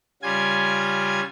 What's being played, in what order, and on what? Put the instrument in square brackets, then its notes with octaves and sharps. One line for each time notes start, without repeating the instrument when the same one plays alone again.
[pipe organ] C#3 G3 F4 G#5 G#6